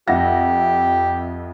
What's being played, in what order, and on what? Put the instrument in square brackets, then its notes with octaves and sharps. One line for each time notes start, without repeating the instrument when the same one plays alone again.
[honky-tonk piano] F2 E5 A#6 [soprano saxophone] G4 [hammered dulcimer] F#5